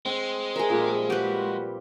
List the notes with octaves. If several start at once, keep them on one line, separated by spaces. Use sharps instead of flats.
G#3 C4
G#4 A#4 E5
A#2 F3 G3
F#4 G4 B4